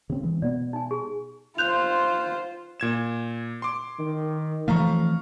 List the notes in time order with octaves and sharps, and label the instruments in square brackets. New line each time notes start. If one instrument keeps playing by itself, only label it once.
[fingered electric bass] C#3 C4
E3 G#3
[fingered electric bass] B2 B3 [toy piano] D5
[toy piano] D#4 G#5
G#4
[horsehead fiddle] F4 C5 [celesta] F#6 G6 F7
[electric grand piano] A#2 G#6 E7
C6 D6
[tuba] D#3
[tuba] F2 [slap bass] E3 F3 A3 [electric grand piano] F5 A#5 C#6